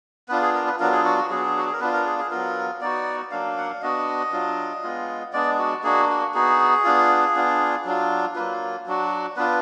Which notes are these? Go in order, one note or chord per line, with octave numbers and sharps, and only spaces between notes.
B3 D4 F4 B4
G#4
A#4
B4
F#3 B3 D4 F4 A#4
G#4
F#4
F#4
F#3 B3 D4 G#4
F#4
G#4
A#4
B3 D4 F4 B4
A#4
G#4
G#4
F#3 B3 F4 A#4
B3 D#4 F#4 D5
F#3 A#3 D4 F5
F#5
F5
B3 D4 F#4 D#5
F#3 D4 F4
G#3 B3 F4
G#3 B3 D4 D5
F#4
A#3 D4 F#4 G#4
F#4
B3 D#4 F#4 G#4
B3 D4 F4
B3 D4 F4
F#3 D4 F4
F#3 A#3 F4 B4
F#3 D4 F#4
B3 D4 F4 B4